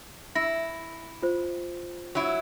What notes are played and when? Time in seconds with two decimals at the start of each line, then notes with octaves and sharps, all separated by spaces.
0.35 E4 A#6
1.22 F4 C5
2.15 F#3 E4